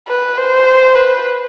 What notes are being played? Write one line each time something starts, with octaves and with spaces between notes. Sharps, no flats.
B4
C5
B4